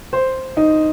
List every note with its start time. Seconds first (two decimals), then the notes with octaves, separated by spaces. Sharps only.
0.13 C5
0.57 D#4